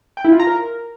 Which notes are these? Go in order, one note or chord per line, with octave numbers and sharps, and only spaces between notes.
G5
E4
F4
A#5
A#4